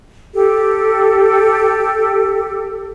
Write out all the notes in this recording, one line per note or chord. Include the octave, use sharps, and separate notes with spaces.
G4 A4